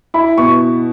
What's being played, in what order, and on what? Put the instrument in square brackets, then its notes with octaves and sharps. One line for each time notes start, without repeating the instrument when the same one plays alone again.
[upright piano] E4 [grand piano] B5
[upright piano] B2 [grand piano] C#6